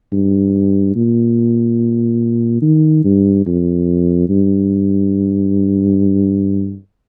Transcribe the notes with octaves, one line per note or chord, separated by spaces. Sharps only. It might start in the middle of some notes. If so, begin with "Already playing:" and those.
G2
A#2
D#3
G2
F2
G2